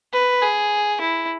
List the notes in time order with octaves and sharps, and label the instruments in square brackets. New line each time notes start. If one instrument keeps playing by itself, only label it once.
[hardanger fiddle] B4
G#4
E4